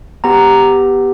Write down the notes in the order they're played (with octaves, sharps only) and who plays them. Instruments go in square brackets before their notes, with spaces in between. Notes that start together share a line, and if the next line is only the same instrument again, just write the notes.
[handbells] B3 G4 A#5